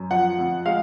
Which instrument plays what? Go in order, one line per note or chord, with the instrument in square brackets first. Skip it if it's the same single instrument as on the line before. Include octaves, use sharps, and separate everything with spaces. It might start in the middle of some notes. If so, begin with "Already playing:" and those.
Already playing: [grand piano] F#2
F3 F#5
F2
G#3 F5